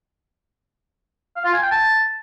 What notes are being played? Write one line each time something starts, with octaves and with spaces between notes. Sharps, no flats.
F5
F4
G#5
G5
A5